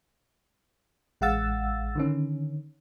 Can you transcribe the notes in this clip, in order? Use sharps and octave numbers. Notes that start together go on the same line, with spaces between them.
A1 G#3 F5 F#5 E6 A6
D3 D#3 C#4